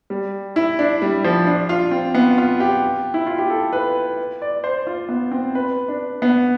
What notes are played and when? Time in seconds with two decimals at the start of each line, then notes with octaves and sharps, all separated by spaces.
0.10 G3
0.56 E4
0.79 D4
1.02 G3
1.24 F3
1.47 D4
1.69 F4
1.91 C4
2.15 B3
2.38 F4
2.60 G4
3.14 E4
3.26 F4
3.38 G4
3.50 A4
3.73 B4
4.42 D5
4.64 C5
4.87 F4
5.09 B3
5.31 C4
5.55 B4
5.88 D4
6.22 B3